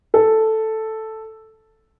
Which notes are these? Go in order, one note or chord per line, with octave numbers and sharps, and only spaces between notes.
A4